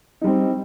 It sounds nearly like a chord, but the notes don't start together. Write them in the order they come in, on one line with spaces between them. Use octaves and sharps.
D#4 G3 C4